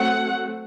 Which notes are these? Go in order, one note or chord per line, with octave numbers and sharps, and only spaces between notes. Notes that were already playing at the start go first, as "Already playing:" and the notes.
Already playing: F#3 A3 C4 F#5